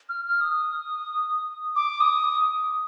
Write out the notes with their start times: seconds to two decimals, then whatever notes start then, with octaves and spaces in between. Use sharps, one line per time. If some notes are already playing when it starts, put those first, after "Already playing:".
0.09 F6
0.25 F6
0.41 D#6
1.76 D6
2.01 D#6